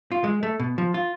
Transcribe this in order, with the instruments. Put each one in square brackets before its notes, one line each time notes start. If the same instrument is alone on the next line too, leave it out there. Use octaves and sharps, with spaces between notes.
[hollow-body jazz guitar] F4
G#3
A3
B2
F3
F4